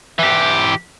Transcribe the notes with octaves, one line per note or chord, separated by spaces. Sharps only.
E3 G4